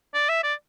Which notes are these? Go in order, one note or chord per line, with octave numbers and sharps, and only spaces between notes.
D5
E5
D5